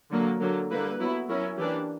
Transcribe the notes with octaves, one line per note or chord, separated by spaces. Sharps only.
D3 F#3 A#3
D3 F#3 A#3
D3 G3 A#3 E4 B4
F#3 B3 E4
F#3 C#4 E4 A#4
E3 A#3 D4 G4